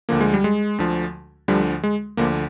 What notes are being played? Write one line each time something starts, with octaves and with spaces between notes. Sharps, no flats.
D2 D3 F3 A#3
G#3
G3
G#3
D2 D3 F3
D2 D3 F3 G3
G#3
D2 D3 F3 A#3